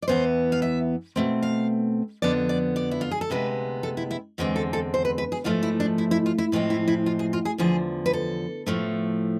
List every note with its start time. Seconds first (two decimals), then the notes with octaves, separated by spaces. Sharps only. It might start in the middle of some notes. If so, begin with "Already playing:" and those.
0.02 D5
0.08 E2 C3 E3 B3 C5
0.52 F5
0.62 E5
1.16 B2 A3 C4
1.43 F5
2.22 F2 D3 F3 B3 D5
2.49 D5
2.76 D5
2.91 E4
3.01 F4
3.11 G#4
3.21 A4
3.30 D2 C3 G#3 B3 B4
3.83 A4
3.97 E4
4.11 E4
4.38 E2 D3 G#3 C4
4.56 A4
4.73 A4
4.94 C5
5.05 B4
5.18 B4
5.32 G#4
5.44 G#2 F3 A3 F4
5.63 E4
5.80 D4
5.98 E4
6.11 E4
6.26 F4
6.38 E4
6.52 A2 F3 G#3 C4
6.70 E4
6.88 E4
7.06 F4
7.19 G#4
7.33 F4
7.45 G#4
7.58 E2 D3 F3 G#4
8.06 B4
8.13 A4
8.66 A2 F3 A3